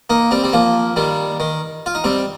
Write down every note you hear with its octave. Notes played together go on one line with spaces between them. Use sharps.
A#3 D#4
G3 C4
G3
F3 A#3
D#3 G3
D#3
F4
D#4
G3 C4